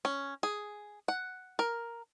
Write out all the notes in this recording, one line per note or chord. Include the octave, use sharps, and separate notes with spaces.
C#4
G#4
F#5
A#4